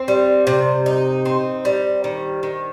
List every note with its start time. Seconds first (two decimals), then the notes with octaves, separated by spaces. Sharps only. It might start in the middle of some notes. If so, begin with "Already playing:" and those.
Already playing: C4 C5
0.08 G3
0.47 C3 C5
0.86 D#4
1.25 C4
1.65 G3
2.04 D#3
2.43 D#3